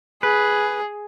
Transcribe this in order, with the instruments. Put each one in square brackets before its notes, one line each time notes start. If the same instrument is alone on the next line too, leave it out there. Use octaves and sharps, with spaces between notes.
[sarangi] G#4 [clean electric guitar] B4